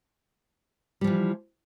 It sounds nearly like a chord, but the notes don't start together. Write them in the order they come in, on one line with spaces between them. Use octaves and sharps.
G3 F3 E3